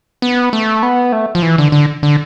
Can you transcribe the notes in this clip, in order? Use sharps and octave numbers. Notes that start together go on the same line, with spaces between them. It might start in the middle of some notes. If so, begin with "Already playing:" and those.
B3
A3
B3
A3
F3
E3
D3
D3
D3